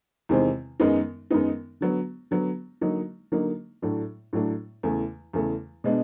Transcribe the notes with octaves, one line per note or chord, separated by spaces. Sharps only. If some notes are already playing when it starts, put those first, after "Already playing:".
E2 C3 D#3 G#3 C4
F#2 D#3 G#3 B3 D#4
F#2 D#3 G#3 B3 D#4
D3 F#3 B3
D3 F#3 B3
D3 F#3 A#3 D#4
D3 F#3 A#3 D#4
A2 F#3 A3 D4
A2 F#3 A3 D4
E2 C#3 E3 A3
E2 C#3 E3 A3
B2 G#3 B3 D4